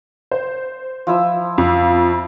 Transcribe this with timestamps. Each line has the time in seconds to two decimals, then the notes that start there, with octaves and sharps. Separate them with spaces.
0.31 C5
1.07 F3 E4 E5
1.58 F2